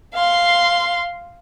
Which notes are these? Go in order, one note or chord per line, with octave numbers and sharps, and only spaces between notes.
F5 C6